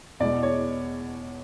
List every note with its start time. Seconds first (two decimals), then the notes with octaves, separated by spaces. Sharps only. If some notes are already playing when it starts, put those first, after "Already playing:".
0.20 E2 B2 G#3 D5
0.43 C#5